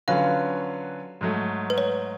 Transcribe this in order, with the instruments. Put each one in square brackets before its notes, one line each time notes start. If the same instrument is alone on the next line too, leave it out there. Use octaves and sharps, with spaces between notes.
[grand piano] D3 F#3 C#4 F4 B4 [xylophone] F5
[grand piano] G#2 F#3 A3
[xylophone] B4
C#5